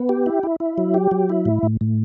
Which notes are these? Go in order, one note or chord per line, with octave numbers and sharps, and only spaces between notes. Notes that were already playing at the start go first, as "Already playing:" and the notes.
Already playing: B3
G4
E4
E4
E4
F#3
G4
F#3
E4
A2
A2
A2